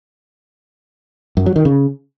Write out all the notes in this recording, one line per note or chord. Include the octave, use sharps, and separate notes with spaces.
F#2
F#3
D#3
C#3